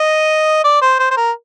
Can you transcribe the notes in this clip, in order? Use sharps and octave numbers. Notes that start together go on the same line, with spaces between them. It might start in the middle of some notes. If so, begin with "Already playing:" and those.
Already playing: D#5
D5
C5
C5
C5
A#4